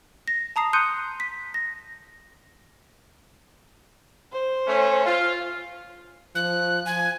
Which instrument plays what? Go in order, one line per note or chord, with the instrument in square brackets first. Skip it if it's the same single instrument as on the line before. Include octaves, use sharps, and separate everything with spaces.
[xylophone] A#6
A5 A#5 D#6 C7
C6 D#6 F#6 G6 C#7 D#7
B6
A#6
[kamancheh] C5
[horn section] A3 C#4
F4
[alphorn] F3 [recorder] F#6
[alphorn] F3 [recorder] G#5